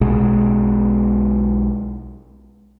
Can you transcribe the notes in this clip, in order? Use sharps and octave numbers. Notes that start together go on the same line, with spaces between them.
B1 B2 G#3